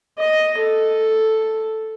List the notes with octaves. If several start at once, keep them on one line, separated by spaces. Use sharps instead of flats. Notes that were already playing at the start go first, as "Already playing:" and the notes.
D#5
A4